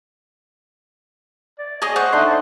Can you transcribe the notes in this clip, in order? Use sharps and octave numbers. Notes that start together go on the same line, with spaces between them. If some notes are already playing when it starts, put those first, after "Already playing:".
D5
G#4 C#5 D#5 G#5
C5 F#5 C#6
A3 D4 D#4 C6
D5